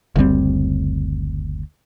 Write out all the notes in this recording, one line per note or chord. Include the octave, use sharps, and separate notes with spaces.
F#1 D2 G3 C4